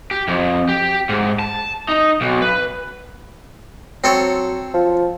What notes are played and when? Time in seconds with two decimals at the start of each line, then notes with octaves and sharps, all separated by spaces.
0.11 G4
0.28 F2
0.69 G4
1.09 G#2
1.39 A5
1.89 D#4
2.21 B1
2.42 B4
4.04 F#3 C4 A4 C#5
4.74 F3